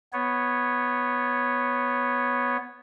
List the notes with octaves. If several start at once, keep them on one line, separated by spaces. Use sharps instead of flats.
B3 C#5